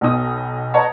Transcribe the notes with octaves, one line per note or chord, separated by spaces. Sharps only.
B1 B2 D#4 D#6
B4 C#5 D#5 F#5 A5 A#5